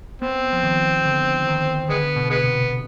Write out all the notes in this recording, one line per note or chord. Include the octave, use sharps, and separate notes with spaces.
B3 C4
F3
D#3
D3
D#3
D3 G#3 B3
B2
G#3 B3
C3